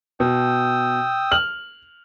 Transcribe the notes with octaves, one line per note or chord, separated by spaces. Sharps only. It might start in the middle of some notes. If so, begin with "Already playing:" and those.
B2 G5 D#6 E6
F6 F#7